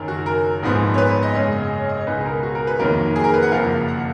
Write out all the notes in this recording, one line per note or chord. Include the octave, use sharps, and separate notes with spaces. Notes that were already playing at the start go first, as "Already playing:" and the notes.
Already playing: F#1 F#2 D#3 A#4
F#4
A#4
A#1 G#2 F3 B3
C#5
B4
C#5
D#5
F#2 C#3 G#3 C#5
D#5
C#5
D#5
C#5
C#2 B2 G#3 D#4 B4
G#4
A#4
F#4
A#4
B4
F1 F2 D#3 F#3 A#3 A#4
G#4
A#4
B4
F#5
F#1 F2 F3 A#3 F5
F#5